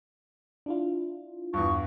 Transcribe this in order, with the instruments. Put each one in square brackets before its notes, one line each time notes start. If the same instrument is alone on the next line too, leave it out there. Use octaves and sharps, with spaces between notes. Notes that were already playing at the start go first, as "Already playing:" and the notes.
[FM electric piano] D4 E4 F4
[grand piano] E2 G2 [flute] C#6